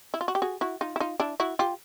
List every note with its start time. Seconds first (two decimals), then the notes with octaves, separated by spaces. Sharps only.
0.14 E4
0.21 F4
0.28 F#4
0.35 G4
0.42 F#4 G#4
0.61 E4 F#4
0.81 D#4 F4
0.96 E4
1.00 D#4 F4
1.20 D4 E4
1.40 E4 F#4
1.59 F4 G4